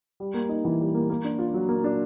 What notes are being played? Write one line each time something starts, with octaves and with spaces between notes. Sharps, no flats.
G3
A#3
D#4
E3
G3
A#3
A#3
D4
F4
F#3
A#3
D4